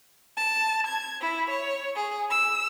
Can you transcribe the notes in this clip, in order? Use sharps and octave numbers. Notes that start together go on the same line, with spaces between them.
A5
G#6
E4
C#5
G#4
E6